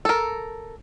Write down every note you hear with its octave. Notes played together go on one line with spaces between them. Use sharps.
A4 A#4